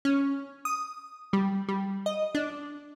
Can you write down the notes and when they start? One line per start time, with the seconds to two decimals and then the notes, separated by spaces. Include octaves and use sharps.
0.05 C#4
0.65 D#6
1.33 G3
1.68 G3
2.06 D#5
2.35 D4